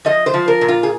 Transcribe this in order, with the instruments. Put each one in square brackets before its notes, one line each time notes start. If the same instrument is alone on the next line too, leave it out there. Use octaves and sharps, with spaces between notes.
[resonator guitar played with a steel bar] F3 D#5
C5
F3
A#4
A#2
F4
G#4